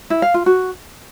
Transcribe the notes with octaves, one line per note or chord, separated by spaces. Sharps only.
E4
F5
F4
F#4